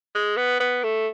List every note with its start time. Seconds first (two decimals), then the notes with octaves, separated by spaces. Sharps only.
0.15 G#3
0.37 B3
0.60 B3
0.84 A3